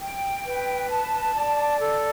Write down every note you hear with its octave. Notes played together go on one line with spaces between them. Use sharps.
G5
B4
A5
D5
A4